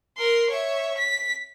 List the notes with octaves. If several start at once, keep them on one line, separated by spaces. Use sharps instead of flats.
A#4 C6
C#5 E5
B6